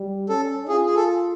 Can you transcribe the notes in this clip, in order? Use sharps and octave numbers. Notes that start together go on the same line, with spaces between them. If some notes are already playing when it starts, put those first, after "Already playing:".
Already playing: G3
C#4 A4
F4 G#4
G#4
A4